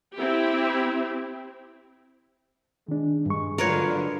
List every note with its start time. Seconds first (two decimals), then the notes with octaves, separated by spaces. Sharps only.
0.15 C4 E4 G4
2.88 D#3 G#3 D4
3.26 G2 G#3 C#6
3.58 D3 F#3 G#3 F4 A#4 B4 C#5